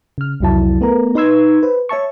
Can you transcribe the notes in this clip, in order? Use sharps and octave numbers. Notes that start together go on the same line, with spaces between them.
C#3 F6
C2 F2 F#3 E4 A5
A3 B3 A#4 A#5
D#4 B4 C6 E6 G#6
B4 C5
C#5 E5 A5 C#6